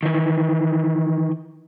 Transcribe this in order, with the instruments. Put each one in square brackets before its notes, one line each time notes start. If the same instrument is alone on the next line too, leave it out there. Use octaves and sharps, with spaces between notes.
[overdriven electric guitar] D#3 E3